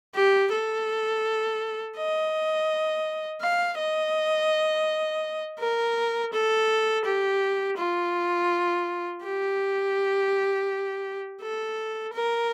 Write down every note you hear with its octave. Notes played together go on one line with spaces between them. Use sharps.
G4
A4
D#5
F5
D#5
A#4
A4
G4
F4
G4
A4
A#4